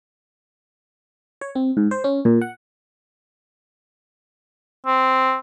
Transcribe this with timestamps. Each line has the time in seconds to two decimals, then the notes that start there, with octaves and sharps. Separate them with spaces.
1.41 C#5
1.55 C4
1.77 G#2
1.91 C5
2.04 C#4
2.25 A#2
2.41 F#5
4.86 C4